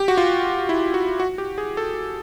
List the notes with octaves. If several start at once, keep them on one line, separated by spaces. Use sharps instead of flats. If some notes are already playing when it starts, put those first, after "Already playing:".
Already playing: G4
F#4
F4
E4
F#4
F#4
G4
G#4
A4